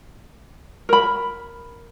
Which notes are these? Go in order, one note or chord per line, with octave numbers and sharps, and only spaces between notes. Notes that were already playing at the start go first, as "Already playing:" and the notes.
A#4 B5